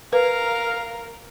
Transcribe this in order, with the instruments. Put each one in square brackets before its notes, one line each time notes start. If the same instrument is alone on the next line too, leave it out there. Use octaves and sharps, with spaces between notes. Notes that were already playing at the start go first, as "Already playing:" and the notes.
[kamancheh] A#4 [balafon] B4 [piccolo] F5